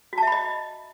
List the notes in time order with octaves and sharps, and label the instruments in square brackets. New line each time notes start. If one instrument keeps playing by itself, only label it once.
[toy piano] F#4
A5
E5
B5
D#5